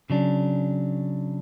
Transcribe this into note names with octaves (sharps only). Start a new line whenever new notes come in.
C#3 F#3 D4